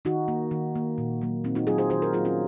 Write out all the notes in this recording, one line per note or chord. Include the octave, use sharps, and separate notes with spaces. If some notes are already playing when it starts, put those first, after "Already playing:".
D#3 D#4 F#4
A#3
D#3
A#3
A#2
F#3 A#3
A#2 C4 D#4
D#4 F#4
F#3 A#3 F4 G#4
G#4 C5
D#3 G#4 C5
F#4 A#4
F#3 A#3 F4 G#4
C#4 F4